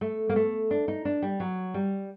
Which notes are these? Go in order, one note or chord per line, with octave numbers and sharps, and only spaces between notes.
A3
A#3
A3
D4
D#4
D4
G3
F#3
G3